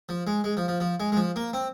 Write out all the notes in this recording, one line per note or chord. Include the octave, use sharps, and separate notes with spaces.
F3
G#3
G#3
F3
F3
F3
G#3
G#3
F3
A#3
C4